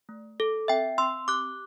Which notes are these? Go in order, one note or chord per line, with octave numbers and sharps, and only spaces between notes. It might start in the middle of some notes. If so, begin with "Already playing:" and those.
A3
A4
C4 E5 G5
C4 C6 E6
G4 D6 F#6